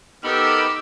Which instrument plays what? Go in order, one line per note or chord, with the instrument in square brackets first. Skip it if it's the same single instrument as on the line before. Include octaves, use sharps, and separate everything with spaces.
[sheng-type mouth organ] B3 D#4 [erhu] G4 [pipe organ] A4 A#4 B5 [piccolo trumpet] E6